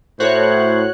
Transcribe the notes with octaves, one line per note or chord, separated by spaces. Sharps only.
A2 F#4 C5 C#5 F#6